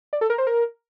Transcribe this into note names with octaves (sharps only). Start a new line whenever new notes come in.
D5
A4
A#4
C5
A#4